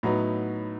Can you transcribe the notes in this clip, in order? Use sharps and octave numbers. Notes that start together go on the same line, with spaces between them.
A2 F#3 B3 D#4 A#5